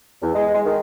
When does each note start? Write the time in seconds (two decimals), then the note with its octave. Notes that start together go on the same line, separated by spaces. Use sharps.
0.22 E2
0.35 G#3
0.54 G#3
0.66 D#3